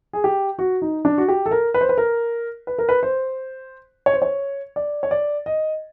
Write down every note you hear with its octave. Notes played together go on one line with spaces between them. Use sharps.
G#4
G4
F#4
D#4
D4
F#4
G4
A4
A#4
B4
C5
B4
A#4
B4
A#4
B4
C5
C#5
C5
C#5
D5
C#5
D5
D#5